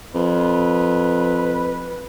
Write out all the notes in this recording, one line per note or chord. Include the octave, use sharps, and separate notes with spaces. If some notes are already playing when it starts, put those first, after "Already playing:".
F2 B4